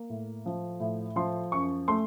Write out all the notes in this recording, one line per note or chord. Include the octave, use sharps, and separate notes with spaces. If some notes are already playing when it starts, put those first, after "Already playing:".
Already playing: A#3
A2
F3
A2
F3 C6
F#2 C#6
A3 C6